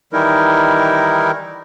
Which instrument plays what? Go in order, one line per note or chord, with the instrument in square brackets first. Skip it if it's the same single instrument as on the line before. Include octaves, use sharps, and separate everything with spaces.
[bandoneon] D#3 E3 G3 D#4 E4 A#4